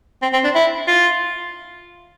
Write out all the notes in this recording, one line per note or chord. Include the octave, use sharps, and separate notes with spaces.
C4
C4
D4
E4
F4